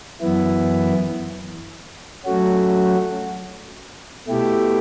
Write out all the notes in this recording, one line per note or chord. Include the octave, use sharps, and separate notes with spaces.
F#2 E3 B3 E4
F#3 A3 C#4 F#4
B2 A3 E4 G4